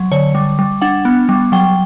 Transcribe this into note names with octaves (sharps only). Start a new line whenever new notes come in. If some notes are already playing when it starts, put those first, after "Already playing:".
Already playing: F#3
D3 C#5
G3
G3
D4 F#5
B3
G3
F#3 G5